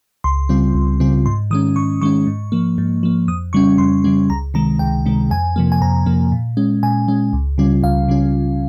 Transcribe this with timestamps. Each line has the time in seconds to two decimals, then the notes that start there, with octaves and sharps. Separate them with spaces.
0.24 C#2 C6
0.49 C#3 G3 C4 F4
0.74 C#2
1.00 C#3 G3 C4 F4
1.26 G#2 C6
1.51 D#3 G#3 C#4 D#6
1.76 G#2 C#6
2.01 D#3 G#3 C#4 C#6
2.27 G#2
2.52 F3 A#3
2.78 G#2
3.03 F3 A#3
3.28 F2 D#6
3.53 C#3 G3 C#4 C#6
3.78 F2 C6
4.04 C#3 G3 C#4
4.30 C#2 A#5
4.54 C3 D#3 G#3 A#5
4.79 C#2 G5
5.06 C3 D#3 G#3
5.30 F2 G#5
5.56 C3 F3 A#3
5.72 G#5
5.82 F2 A#5
6.06 C3 F3 A#3
6.32 A#2
6.57 G#3 C#4
6.83 A#2 G#5
7.08 G#3 C#4
7.33 C#2
7.58 C#3 G3 C#4 F4
7.83 C#2 F5
8.08 C#3 G3 C#4 F4